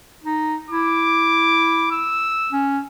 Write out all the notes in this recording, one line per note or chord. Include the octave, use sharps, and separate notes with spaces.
D#4
E4 D6
E6
C#4